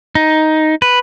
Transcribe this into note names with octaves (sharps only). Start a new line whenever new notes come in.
D#4
B4